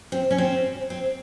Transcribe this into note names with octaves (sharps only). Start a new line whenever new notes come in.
C4
C#4
C4
C4